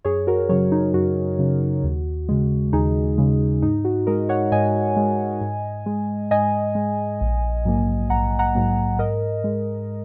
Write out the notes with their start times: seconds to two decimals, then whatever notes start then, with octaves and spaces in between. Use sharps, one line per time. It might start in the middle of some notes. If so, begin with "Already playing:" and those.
0.05 F#2 G#4 C#5
0.27 F#4 A#4
0.49 C#3 F#3 G#4 C#5
0.72 D#4
0.94 F#2 F#4
1.39 C#3 F#3
1.83 D#2
2.29 C#3 G#3
2.73 D#2 D#4 G#4
3.18 C#3 G#3
3.62 G#2 D#4
3.85 F#4
4.07 G#3 A#4 D#5
4.29 C#5 F#5
4.52 G#2 D#5 G#5
4.97 G#3
5.41 G#2
5.86 G#3
6.31 G#2 D#5 G#5
6.75 G#3
7.21 A#1
7.65 G#2 F#3 A#3
8.10 A#1 F#5 A#5
8.39 F#5 A#5
8.55 G#2 F#3 A#3
8.99 G#2 A#4 D#5
9.44 G#3